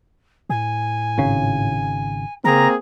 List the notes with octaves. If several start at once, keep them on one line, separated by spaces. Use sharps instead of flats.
A2 G#5
G#1 C#3
C#3 A#3 C4 G#4 A#5